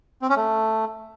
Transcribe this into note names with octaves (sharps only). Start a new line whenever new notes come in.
C4
C#4
A3